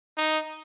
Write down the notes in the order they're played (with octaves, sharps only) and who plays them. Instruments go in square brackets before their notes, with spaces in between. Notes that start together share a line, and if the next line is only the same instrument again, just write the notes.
[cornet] D#4